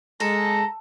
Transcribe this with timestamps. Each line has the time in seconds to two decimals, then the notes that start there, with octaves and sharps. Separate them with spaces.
0.20 G#3 A4 A#5